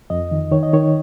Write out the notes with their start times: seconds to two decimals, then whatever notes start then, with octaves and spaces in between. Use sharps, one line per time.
0.10 F2 D#5
0.31 D#3
0.51 D#3 C#5
0.63 D#5
0.73 D#3 C#5